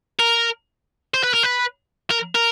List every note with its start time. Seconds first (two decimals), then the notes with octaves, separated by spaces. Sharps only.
0.19 A#4
1.14 C5
1.24 B4
1.34 A#4
1.43 B4
2.10 A#4
2.35 A#4